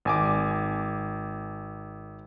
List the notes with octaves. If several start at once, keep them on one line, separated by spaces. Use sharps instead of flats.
G#1 G#5 D6